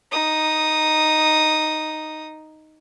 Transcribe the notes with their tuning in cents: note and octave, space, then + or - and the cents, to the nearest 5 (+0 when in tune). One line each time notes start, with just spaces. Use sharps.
D#4 +0 D#6 -5